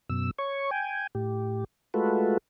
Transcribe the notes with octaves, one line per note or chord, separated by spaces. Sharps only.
F#2 B2 E6
C#5 C#6
G5 G#5
A2 G4
G#3 A3 F4 F#4 A4 B4